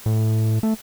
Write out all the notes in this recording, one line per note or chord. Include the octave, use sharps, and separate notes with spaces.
A2
A3